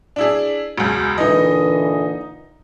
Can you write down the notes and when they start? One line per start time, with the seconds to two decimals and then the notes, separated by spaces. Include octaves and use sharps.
0.16 D4 E4 G#4
0.78 E1 C#2
1.18 A#2 D3 E3 D#4 D#5